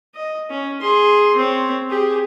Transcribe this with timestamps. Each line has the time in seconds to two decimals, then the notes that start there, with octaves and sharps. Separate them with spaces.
0.15 D#5
0.50 C#4
0.81 G#4 C6
1.36 C4 C#5
1.90 G4 G#4